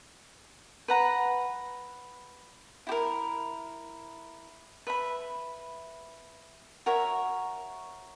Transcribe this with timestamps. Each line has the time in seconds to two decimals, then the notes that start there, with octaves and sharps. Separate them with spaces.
0.88 B4 F#5 A#5
2.87 E4 G4
2.92 A#4
4.87 B4 E5 B5
6.86 F#4 A#4 C#5 E5